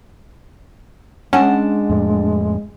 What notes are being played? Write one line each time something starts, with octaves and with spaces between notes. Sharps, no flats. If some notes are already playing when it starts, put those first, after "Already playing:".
G#3 C#4 D4 F#5 A5
F2 A2